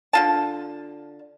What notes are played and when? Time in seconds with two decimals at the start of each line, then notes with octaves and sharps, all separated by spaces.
0.13 D3 F4 A5